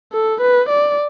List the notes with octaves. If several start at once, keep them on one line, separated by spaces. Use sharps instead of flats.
A4
B4
D5